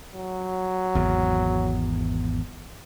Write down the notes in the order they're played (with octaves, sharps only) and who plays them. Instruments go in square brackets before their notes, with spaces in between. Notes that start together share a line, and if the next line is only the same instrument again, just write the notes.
[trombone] F#3
[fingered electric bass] G#1 E2